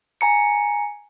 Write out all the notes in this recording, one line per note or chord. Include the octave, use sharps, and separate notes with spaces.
G#5 A#5 C#7